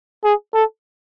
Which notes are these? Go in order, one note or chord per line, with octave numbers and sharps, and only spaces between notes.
G#4
A4